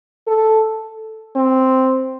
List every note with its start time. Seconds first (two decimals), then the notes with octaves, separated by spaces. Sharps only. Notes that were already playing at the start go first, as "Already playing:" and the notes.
0.27 A4
1.36 C4